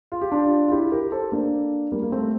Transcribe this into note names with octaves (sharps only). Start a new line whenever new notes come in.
F4
G4
D4 F4
F4
E4 G4
G4 A#4
A4 C5
A#3 D4
G3 A#3
A#3
A3 C4